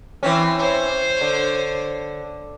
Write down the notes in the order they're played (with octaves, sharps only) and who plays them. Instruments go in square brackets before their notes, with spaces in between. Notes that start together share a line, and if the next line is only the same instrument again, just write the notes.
[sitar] E3 C4 C#4
[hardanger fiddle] C5 C#5
[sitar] D3